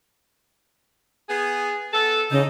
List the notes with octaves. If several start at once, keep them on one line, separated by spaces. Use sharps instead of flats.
B3 G#4
B3 A4
C#3 E3 D#4